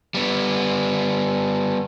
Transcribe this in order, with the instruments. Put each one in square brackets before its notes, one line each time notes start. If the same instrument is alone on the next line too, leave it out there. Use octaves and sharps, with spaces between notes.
[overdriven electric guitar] G3 B3